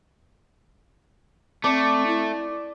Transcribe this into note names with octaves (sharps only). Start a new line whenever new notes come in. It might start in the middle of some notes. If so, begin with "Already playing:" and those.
A3 C4 D5
E4